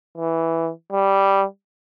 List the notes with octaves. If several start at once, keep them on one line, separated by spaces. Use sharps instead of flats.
E3
G3